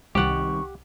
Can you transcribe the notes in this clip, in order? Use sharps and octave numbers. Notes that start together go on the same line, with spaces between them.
C2 D#3 G3 C4 G4 F#5 C#6 A6